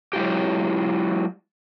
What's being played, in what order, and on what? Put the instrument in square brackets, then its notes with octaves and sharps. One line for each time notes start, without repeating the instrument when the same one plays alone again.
[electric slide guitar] F#3 G#3 E4 F4 G4